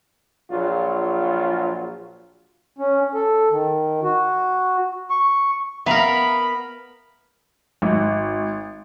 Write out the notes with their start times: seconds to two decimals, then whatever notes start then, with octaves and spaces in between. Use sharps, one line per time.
0.50 A#1 F#3 F4
2.79 C#4
3.14 A4
3.51 D#3
4.03 F#4
5.10 C#6
5.86 B3 A#4 E5 F5 A#5 B5
7.82 G#1